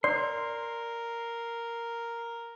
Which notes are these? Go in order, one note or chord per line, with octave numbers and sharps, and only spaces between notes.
A#4 D5 C6